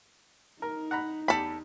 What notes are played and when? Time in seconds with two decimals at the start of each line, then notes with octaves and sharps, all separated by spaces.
0.62 D#4 A#4
0.91 F#5 A#5 B5
1.28 E2 G4 A4 B5